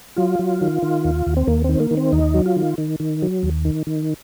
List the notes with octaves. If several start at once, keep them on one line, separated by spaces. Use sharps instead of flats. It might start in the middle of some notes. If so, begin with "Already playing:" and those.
F#3 F4
F#3
D#3
D#3
D#2
D#2
C4
D#2 A#3
D#3 C4
A#3
D#3
C4
D#2 D#4
F#3
F4
D#3
D#3
D#3
F#3
D#2
D#3
D#3